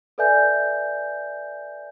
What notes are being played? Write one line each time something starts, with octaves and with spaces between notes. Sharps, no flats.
A4 B4 D5 E5 G#5 G6